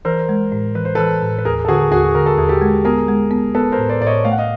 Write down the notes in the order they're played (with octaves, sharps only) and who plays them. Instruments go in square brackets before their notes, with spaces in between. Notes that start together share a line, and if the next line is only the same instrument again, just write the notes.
[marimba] E3 [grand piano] A#4 C5
[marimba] G#3
A2
[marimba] E3 [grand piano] B4
[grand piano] C5
[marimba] E3 [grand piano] A4 B4
[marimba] A2
[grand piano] B4
[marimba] D#2 [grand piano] G#4 A#4
[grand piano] A4
[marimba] D3 [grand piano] F#4 G#4
[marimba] D#2 [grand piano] F#4 G#4
[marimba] D3 [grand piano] A#4
[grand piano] A4
[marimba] D#2 [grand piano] G#4
[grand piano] G4 A4
[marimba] G#3
[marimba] B3 [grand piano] G#4 A#4
[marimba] G#3
B3
[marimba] B3 [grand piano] A4 B4
[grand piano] A#4 C5
[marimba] A2
[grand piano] C5 D5
[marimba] A2 [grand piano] D5
[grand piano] C#5 D#5
[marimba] A3 [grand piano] F5
[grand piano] F#5
D#5 F5